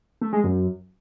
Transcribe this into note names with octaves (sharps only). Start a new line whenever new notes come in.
A3
G#3
F#2